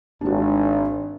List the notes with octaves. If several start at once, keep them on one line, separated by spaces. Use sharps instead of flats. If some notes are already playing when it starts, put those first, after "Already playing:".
G#1 D4 F#4